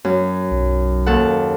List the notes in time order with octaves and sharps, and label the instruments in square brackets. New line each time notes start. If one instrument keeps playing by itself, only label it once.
[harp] F#2
[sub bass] B1
[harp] D#2 A4 F#5